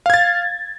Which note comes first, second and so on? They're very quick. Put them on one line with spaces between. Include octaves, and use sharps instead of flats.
F5 G#6 A6